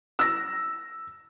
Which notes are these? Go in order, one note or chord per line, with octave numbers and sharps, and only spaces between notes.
E6 A#6